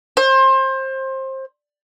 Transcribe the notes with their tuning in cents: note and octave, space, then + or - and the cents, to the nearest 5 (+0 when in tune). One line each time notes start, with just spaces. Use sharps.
C5 +25